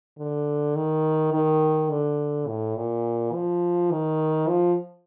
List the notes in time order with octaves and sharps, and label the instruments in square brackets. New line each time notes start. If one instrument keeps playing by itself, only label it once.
[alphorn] D3
D#3
D#3
D3
A2
A#2
F3
D#3
F3